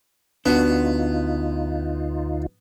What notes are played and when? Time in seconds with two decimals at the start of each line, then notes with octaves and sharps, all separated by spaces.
0.46 D2 B3 D4 D#4 F4 F#4